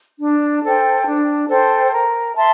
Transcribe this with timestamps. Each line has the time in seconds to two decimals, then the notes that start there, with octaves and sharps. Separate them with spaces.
0.20 D4
0.64 A4 C5 G5
1.06 D4
1.49 A4 C5 G5
1.92 A#4
2.35 E5 A5 C6